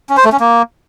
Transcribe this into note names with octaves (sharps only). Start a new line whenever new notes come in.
C#4
C5
A3
C#4
A#3